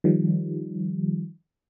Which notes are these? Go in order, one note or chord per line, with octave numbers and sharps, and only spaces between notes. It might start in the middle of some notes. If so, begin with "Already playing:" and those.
D#3 F3 G3